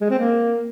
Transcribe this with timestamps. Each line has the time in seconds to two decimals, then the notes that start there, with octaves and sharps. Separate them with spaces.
0.01 G#3
0.10 C4
0.19 A#3